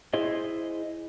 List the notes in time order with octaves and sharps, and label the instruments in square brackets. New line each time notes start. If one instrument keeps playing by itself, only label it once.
[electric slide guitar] E4 G#4 C5 D#5